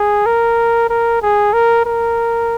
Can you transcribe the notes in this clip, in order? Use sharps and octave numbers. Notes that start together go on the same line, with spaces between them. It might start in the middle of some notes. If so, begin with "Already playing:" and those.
Already playing: G#4
A#4
A#4
G#4
A#4
A#4